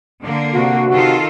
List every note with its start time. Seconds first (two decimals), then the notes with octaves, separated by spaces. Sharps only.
0.22 D3 A#3
0.53 C3 F#4
0.91 D#3 F4 A4